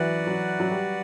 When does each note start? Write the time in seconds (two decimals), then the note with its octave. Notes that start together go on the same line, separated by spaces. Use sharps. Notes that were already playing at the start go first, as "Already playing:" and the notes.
Already playing: E3 F#3 F#4 B4 D5 F#5
0.27 F#3
0.60 F#3
0.71 G3